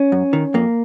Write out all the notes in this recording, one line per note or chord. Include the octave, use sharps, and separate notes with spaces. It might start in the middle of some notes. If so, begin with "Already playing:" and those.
Already playing: C#4
F#2
D#3
F2 A#3